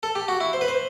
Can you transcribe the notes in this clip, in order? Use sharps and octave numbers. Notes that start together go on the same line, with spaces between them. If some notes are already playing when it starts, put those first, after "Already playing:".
A4
G4
F#4
E4
C5
B4
C5